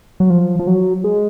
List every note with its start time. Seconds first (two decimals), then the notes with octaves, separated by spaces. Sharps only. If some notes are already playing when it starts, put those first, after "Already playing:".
0.20 F#3
0.30 F3
0.59 F3
0.67 F#3
1.04 G#3